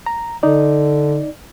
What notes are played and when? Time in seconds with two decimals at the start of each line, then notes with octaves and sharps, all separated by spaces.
0.06 A#5
0.43 D3 D#4 D5